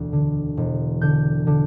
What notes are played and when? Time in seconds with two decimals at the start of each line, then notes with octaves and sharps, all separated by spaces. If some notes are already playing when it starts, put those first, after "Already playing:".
Already playing: E1 D2
0.13 D3
0.57 E1
1.01 D3 G6
1.47 D3